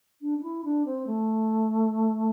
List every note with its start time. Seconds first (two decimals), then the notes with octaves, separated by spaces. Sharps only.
0.21 D4
0.38 D4
0.43 E4
0.64 D4
0.85 C4
1.06 A3